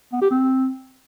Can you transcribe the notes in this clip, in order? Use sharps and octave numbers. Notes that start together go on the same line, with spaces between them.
B3
G4
C4